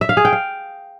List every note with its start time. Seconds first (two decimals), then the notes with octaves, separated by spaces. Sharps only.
0.01 E5
0.09 F5
0.17 G#4
0.25 G5
0.33 F5